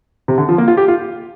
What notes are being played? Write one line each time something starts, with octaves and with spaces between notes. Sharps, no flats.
C3
D3
F3
A#3
F4
G4
F4